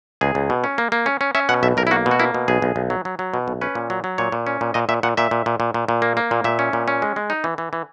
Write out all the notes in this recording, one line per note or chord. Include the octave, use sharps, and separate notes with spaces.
C#2 G#4
C#2
B2
C#4
A#3
A#3
C#4
C#4
C#4 E5
B2 F#5
B1 E5
B1 A#4
E4
A#3 F#4
B2
F#4
A#3 E4
B2
B1 G#4
B1
B1
F#3
F#3
F#3
B2
B1
C#4 B4
A#2
F#3
F#3
A#2 C#5
A#2
C#4
A#2
A#2 D#5
A#2 E5
A#2 F#5
A#2 E5
A#2
A#2
A#2
A#2
A#2
A#3
A#3
A#2
A#2 E5
C#4
A#2
C#4
G#3
G#3
D#4
E3
E3
E3